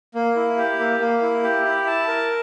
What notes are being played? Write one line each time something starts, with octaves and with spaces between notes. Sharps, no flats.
A#3
E4
G4
A#3
A#3
E4
G4
E4
A5
A#4